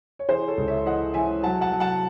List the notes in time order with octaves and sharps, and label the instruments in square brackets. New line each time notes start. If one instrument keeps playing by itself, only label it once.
[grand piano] C#5
E3 G#4 C5
A4 C#5
C#2
C#5 E5
E3 D#5 F#5
E3 E5 G#5
F#3 F#5 A5
F#5 A5
F#3
F#5 A5